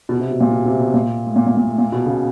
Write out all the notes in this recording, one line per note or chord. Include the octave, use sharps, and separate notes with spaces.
B2
C3
B2
A#2
B2
C3
B2
A#2
A2
A#2
A#2
A#2
A2
A#2
B2
C#3